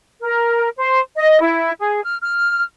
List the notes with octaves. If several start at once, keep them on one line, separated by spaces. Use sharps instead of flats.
A#4
C5
D#5
E4
G#4
F6
F6